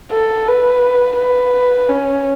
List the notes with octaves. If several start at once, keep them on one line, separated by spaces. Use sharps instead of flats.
A4
B4
B4
C#4